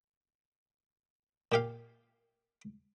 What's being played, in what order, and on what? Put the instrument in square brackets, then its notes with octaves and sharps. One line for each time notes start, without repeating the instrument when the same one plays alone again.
[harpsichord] A#2 G4 F5